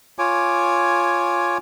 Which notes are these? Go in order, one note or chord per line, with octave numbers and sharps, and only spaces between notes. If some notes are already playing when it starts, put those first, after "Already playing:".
F4 C#5 G#5 D6